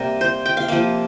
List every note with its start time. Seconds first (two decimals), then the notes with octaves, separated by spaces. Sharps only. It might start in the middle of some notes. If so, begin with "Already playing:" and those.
Already playing: C3 G3 A#3 A#4
0.21 C5
0.46 G5
0.57 F5
0.68 C3 F3 A#3 F5